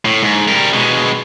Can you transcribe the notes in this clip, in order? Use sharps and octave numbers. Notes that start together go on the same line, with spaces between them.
A2
G#2
G3 A#4
B2 G#3